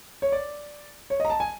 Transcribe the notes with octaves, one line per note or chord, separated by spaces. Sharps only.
C#5
D5
C#5
D#5
A#5
A5
G#5